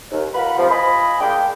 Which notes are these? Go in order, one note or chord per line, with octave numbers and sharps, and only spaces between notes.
D#2
F4 A#4 F#5 B5
C3 F3
F4 D#5 G#5 B5
G#3 A#3 D4 G5